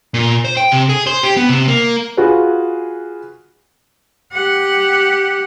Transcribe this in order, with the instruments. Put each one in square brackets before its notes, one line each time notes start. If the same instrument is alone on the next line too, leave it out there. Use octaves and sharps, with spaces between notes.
[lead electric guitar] A#2
C5
G5
C3
G#4
C5
G4
B3
C3
A#3
[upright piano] F4 F#4 G#4 B4
[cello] G4 F#5